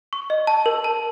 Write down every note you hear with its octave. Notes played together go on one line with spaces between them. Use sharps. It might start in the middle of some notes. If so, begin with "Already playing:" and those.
C#6
D#5
A5
A#4
A5